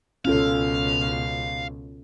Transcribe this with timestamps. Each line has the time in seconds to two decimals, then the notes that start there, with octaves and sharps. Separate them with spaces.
0.25 C#2 B2 C#4 F4 A4 F5